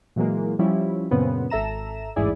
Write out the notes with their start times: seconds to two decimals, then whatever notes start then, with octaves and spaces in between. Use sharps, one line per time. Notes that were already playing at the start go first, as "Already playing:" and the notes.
0.16 A#2 E3 F#3 G#3 A#3
0.59 F3 G3 C#4 E4
1.11 F#2 A#2 C#3 B3 C4
1.50 G#1 A4 E5 A#5 E7
2.16 A1 E2 G#2 E4 G#4 D5